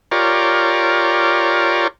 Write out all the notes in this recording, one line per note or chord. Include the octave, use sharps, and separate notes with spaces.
F4 G4 A#4 C#5 D5